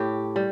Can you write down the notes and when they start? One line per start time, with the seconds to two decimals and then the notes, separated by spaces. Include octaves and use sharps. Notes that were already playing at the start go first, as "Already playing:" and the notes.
Already playing: A2 G4
0.36 G3